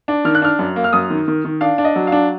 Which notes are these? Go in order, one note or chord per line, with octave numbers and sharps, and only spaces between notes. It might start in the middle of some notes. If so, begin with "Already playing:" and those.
D4
D#3 F6
F#6
D4 F6
F#2
A#3
F6
F#2 D#6
D#3
D#3
D#3
D4 F5
D4
D#5
F#3
D4 F5